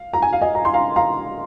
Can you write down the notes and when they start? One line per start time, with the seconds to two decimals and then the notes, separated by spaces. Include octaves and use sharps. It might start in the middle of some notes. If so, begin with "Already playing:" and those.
Already playing: F5
0.13 A#5
0.22 G#5
0.33 F5
0.41 D#5 G#5
0.55 A#5
0.65 C6
0.74 F5 A#5
0.96 F5 A#5